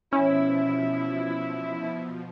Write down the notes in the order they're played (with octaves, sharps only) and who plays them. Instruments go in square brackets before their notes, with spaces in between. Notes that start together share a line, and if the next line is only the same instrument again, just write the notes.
[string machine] B2 F3 [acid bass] C#4 [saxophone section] E4